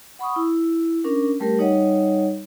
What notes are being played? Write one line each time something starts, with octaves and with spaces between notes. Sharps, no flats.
F#5 B5 C#6 D#6
E4
C#4 D4 A#4
G3 A3 G4 A#4
G3 D#4 C#5 D#5 F#5